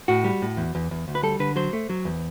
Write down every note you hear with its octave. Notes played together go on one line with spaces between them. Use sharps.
A2 F#4
G3
A2
E2
E2
E2
D2
B4
G3 A4
D3 B4
F#3 C5
A3
F#3
E2